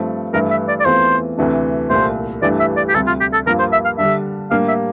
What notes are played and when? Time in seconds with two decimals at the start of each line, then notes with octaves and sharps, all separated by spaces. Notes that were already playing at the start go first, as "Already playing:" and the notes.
Already playing: G2 F3 A3 C4
0.33 G2 E3 A3 E4 A#4
0.51 E5
0.68 D5
0.80 D5
0.85 E2 E3 A3 C4 F4 C5
1.37 D2 C3 E3 A3 D4
1.90 C2 A#2 A3 C5
2.42 G2 E3 A3 D4 G4 D5
2.60 E5
2.76 D5
2.89 G4
2.94 D2 C3 G3 A4
3.07 F4
3.21 G4
3.33 A4
3.46 G2 F3 A#3 F4 A#4
3.59 C5
3.72 E5
3.85 F5
3.98 D3 G3 D4 E5
4.51 A2 G3 A#3 D4 G4 F5
4.68 E5